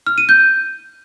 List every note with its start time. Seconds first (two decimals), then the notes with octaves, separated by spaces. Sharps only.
0.07 F6
0.18 D#7
0.29 G6